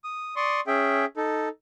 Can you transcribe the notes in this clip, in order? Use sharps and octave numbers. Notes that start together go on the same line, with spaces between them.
D#6
D5 C6 C#6 D#6
C#4 G#4 E5 G5
D#4 A4